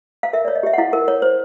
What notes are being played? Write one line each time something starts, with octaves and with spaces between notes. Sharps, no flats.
F5
A#4 E5
C#5 D5
D#5
G4 E5
F#5
E4 F5
A#4
C#5
C5